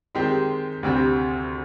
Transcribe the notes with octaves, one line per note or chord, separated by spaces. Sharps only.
D#3 G#3 C4 G4
D2 C3 G3 C4